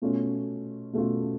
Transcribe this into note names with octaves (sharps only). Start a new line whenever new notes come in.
B2 A3 C#4 F4
B2 A3 C#4 F4